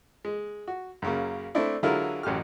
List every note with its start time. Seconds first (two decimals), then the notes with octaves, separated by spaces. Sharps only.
0.25 G#3
0.68 F#4
1.02 F#2 C#3 A#3
1.55 A3 C4 D4 E4
1.83 D3 F#3 G#3 E4 F4 A#4
2.23 A1 F#2 G4 F6